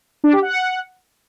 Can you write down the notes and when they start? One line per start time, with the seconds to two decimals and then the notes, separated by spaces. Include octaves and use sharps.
0.24 D4
0.33 G4
0.42 F#5